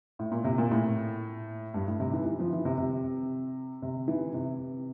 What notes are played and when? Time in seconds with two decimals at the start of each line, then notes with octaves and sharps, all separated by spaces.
0.19 A2
0.31 A#2
0.44 C3
0.58 A#2
0.71 A2
1.74 G2
1.87 A2
2.00 C3
2.13 E3
2.26 E3
2.39 F3
2.53 E3
2.65 C3
2.78 C3
3.82 C3
4.08 E3
4.34 C3